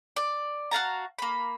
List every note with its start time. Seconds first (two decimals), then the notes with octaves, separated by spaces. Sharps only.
0.16 D5
0.71 F#4 F5 A5 A#5
1.19 A#3 B5